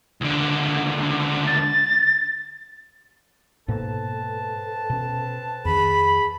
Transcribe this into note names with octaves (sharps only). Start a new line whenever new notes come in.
C#2 D3
A6
G#2 B2 A#3 C4 A4 B4 A5
B2 C#4
F2 D#3 G#4 B5